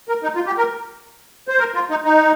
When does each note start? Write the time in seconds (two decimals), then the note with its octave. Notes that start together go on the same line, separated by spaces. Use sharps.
0.09 A#4
0.23 D#4
0.35 F4
0.46 G4
0.58 A#4
1.48 C5
1.59 A#4
1.74 F4
1.90 D#4
2.04 D#4